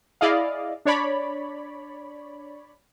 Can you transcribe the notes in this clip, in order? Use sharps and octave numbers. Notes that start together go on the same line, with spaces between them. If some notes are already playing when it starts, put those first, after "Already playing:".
E4 G#4 D5 D#5 F5
D4 C#5 D5 B5